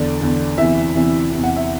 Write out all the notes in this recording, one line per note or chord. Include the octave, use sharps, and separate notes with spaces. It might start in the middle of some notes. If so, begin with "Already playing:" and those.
Already playing: E2 D3 D5
E2 D3
E2 C3 E3 E5
E2 C3 E3
E2 C3 E3
F#5
E5